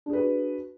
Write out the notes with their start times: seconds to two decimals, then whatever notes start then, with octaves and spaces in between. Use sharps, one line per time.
0.06 D4
0.10 G#4
0.13 B4
0.17 F#4